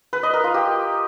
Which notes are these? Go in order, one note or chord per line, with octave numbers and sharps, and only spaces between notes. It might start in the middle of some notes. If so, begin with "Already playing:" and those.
B4
D#5
A#4
F4
G4